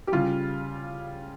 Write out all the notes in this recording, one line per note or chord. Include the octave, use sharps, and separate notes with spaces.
G4
C#3 G3 F4